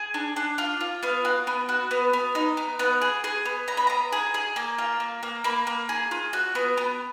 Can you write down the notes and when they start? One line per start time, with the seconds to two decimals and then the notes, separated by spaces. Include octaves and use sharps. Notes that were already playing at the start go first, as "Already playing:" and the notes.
Already playing: G#4
0.14 D4
0.36 D4
0.58 F4
0.81 F4
1.03 B3 F5
1.25 F#4
1.47 B3
1.69 F#4
1.91 B3
2.13 B3
2.35 D#4
2.57 B3
2.79 B3 F#5
3.01 G#4
3.24 G#4
3.45 B3
3.68 B3 A#5
3.77 B5
3.87 B3 A#5
4.12 G#4
4.34 G#4
4.56 A#3
4.78 F4
5.00 A#3
5.23 A#3
5.44 A#3 B5
5.67 A#3
5.89 G#4
6.11 F4
6.33 F#4
6.55 B3
6.77 B3